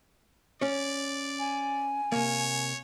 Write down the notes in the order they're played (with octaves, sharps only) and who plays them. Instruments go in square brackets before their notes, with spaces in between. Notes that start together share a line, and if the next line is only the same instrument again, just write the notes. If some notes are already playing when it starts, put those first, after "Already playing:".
[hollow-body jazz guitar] C#4 C#5 [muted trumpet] D5
[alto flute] G#5
[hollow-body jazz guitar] C3 A#3 [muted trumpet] C#5